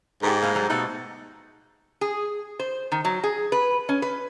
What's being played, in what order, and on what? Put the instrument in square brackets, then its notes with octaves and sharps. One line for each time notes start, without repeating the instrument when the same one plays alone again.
[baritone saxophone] G#2 [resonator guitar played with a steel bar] G4 A4 A#4
[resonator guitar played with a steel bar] A2 A#3
F#3 G3 A#5
[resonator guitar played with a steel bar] B2 G3 A3 [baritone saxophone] D#4
[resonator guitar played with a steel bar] G#4
C5
D#3
F#3
G#4
B4
C#4
B4